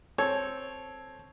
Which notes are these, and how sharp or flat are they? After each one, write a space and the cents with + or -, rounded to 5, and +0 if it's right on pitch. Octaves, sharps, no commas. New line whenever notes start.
C4 +5 A4 -10 C#5 +0